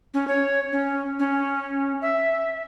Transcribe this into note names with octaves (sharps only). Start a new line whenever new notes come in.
C#4
C#5
C#4
C#4
E5